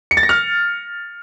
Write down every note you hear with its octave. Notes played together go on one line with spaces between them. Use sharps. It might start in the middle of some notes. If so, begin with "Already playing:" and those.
C#7
A6
A#6
F6